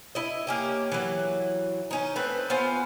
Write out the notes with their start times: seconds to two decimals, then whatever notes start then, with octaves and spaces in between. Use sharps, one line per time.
0.15 E4 D#5
0.47 A#3 C#4 G4
0.92 E3 F#3
1.91 C#4 D#4
2.16 A3 C4 B4
2.50 B3 F4 C5 G#5